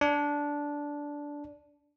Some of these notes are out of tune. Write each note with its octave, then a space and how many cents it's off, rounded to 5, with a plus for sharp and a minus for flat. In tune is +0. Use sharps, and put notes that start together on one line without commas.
D4 -10